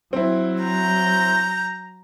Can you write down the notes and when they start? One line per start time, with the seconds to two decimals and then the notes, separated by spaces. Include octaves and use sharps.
0.13 F#3 C4 E4
0.62 A#5 G6